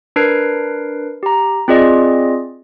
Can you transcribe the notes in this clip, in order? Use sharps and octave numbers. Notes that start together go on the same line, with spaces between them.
D4 A#4 B4 C7 D7
G4 A#5
C4 F4 G#4 D5 D#5